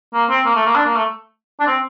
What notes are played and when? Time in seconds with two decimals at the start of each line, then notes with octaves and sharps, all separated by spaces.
0.14 A#3
0.30 C4
0.46 A#3
0.55 A3
0.66 A#3
0.75 D4
0.86 A#3
0.96 A3
1.60 D4
1.67 C4